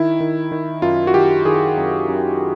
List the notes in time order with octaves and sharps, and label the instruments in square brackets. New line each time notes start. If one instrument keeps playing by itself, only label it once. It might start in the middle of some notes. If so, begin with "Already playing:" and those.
Already playing: [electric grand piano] D#3 E4
D#3
D#3
F#2 F4
F#4
D#3 G4
D#3 G#4
F#2
F#2